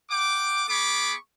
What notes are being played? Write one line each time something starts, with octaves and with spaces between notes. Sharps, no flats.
F#5 G5 D6
B3 G#4 B5 C#6 D6